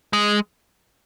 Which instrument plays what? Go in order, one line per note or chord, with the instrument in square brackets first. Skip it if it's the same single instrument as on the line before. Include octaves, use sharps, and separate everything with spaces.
[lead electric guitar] G#3